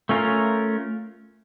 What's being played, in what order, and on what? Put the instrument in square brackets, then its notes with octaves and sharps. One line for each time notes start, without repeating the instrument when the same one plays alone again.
[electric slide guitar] A3 C#4 F4 A#4